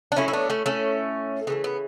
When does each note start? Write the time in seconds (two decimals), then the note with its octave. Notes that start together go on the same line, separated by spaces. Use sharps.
0.12 D4
0.16 A2 F#3 A3 C#4 E4
0.28 E4
0.33 B3 D4
0.50 A3 C#4
0.66 A3 C#4
1.47 C#3 E3 A3 B3
1.64 B3